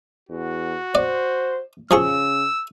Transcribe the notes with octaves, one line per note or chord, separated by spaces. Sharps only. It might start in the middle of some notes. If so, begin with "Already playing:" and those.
E2 F#4
C5 D5
C#3 F3 G#4 C#6 E6